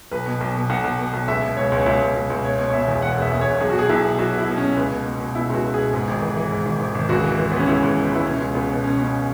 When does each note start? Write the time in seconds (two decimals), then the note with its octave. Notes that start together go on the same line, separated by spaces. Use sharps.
0.11 B1 B4
0.26 B2
0.41 B1
0.55 B2
0.70 B1 F#5
0.84 B1
0.99 B2
1.14 B1
1.28 C#2 E5
1.42 B2
1.57 C#2 C#5
1.72 C#2
1.80 C#5
1.86 C#2 E5
2.01 C#2
2.15 C#2
2.30 C#2
2.44 B2 C#5
2.59 B2
2.67 C#5
2.73 B2 E5
2.88 E2
3.02 E1 F#5
3.17 E1
3.22 E5
3.31 E1
3.41 C#5
3.46 E1
3.60 B1 G#4
3.70 F#4
3.75 B2 G#4
3.89 B1 E4
4.04 B2
4.19 B1 F#4
4.33 B2 E4
4.48 B2
4.57 C#4
4.62 B2
4.77 C#2 B3
4.91 B2
5.06 B2
5.20 B2
5.35 B2 E4
5.50 C#2 F#4
5.64 C#2
5.74 B2 G#4
5.93 G#2
6.08 G#1
6.22 E3
6.37 E3
6.51 G#2
6.66 G#1
6.80 G#1
6.95 G#1
7.09 C#2 F#4
7.24 E3
7.39 E3
7.52 C#2 B3
7.60 C#4
7.68 C#2 E4
7.82 C#2
7.97 E3
8.11 C#2 E4
8.26 B2 C#4
8.40 C#2
8.54 C#2 B3
8.69 B2 B3
8.84 B2 C#4
8.98 B2 C#4